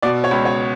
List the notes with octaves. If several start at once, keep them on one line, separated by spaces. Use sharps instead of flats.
B2 D5
C#5
C#2
C#5